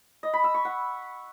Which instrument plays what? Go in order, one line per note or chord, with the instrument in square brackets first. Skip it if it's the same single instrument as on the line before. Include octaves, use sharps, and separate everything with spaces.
[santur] D#5
B5
E6
C#6
F#5